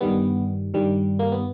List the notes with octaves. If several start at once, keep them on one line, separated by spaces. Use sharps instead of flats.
G2 D#3 G3 B3
G2 D#3 G3
A#3
B3